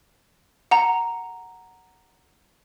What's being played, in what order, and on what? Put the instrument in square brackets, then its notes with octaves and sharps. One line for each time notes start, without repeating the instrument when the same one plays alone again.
[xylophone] F#5 A#5